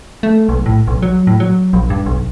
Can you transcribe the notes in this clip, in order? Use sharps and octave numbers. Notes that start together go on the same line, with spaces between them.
A3
B1
A2
B1
F#3
A2
F#3
A#1
G2
B1